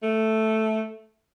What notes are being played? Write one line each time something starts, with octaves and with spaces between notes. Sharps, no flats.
A3